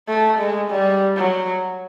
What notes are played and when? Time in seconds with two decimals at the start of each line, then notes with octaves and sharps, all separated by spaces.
0.08 A3
0.39 G#3
0.71 G3
1.17 F#3